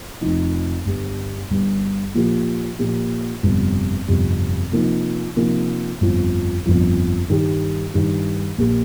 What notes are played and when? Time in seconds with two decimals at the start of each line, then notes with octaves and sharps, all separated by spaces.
0.21 F1 F2 F3 D#4
0.85 G1 G2 G3
1.50 G1 G2 G3
2.14 A#2 F3 A#3 G4
2.79 A#2 F3 A#3 G4
3.43 G1 F2 C3 G3
4.08 G1 F2 C3 G3
4.72 C3 F3 A#3 D#4
5.36 C3 F3 A#3 D#4
6.01 G1 F2 F3
6.66 G1 F2 F3
7.30 G2 D#3 G3 D#4 G4
7.94 G2 D#3 G3 D#4 G4
8.58 A#1 A#2 A#3 G4